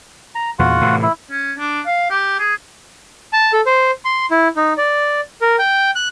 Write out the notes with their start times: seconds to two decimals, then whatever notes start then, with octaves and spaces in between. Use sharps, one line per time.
0.35 A#5
0.59 E2 A#2 F4 F#4 F#5
0.81 A2 C3 E3
1.02 E4
1.30 C#4
1.58 D4
1.86 F5
2.10 G4
2.39 G#4
3.33 A5
3.53 A4
3.66 C5
4.05 C6
4.31 E4
4.56 D#4
4.78 D5
5.41 A#4
5.59 G5
5.95 F#6